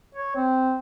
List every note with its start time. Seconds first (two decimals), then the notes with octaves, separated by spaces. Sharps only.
0.15 C#5
0.36 C4